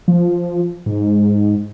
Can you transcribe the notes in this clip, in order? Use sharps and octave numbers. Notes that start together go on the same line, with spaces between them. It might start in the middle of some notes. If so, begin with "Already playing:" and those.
F3
G#2